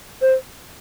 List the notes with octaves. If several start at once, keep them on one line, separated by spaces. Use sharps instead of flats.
C5